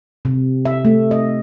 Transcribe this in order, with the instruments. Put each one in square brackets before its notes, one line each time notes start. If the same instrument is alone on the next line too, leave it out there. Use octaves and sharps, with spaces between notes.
[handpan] C3
E5
A3
D#5